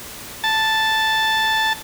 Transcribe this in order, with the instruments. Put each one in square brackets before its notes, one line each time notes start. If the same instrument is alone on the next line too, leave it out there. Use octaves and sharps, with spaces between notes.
[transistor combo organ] A5